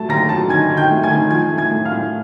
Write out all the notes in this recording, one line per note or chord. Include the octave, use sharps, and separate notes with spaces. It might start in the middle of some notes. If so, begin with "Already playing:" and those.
Already playing: F#3 A3 A5 A6
D#2 A#5 A#6
F#3 A5 A6
D#3 G#5 G#6
D#3
G5 G6
A3
G#5 G#6
D#3
F3 G#5 G#6
A3
G#5 G#6
A2
F5 F6
A2